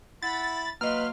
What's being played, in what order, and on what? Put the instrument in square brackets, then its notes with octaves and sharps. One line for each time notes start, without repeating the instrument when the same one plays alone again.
[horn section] E4 B5 [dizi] F#5 [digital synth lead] A6
[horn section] F#3 F5 C6 [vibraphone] A#3 D#5 [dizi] B4 [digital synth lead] F6